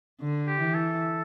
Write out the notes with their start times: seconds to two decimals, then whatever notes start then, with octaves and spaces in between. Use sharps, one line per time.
0.20 D3
0.47 G4
0.61 E3
0.74 A4